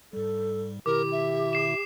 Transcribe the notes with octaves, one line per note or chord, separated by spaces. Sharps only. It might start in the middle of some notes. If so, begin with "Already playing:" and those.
G#2 G3 A4
B2 D#3 E4 G4 A#4 D6
E5
D6 C7 E7